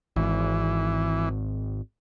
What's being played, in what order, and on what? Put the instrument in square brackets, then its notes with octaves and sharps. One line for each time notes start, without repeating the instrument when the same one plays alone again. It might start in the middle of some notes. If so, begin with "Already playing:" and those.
[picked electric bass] G#1 [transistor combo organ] E3